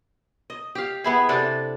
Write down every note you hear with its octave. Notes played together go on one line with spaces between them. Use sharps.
D#5
G4 F5
B3 E4 G#4
C3 D4 A4 D5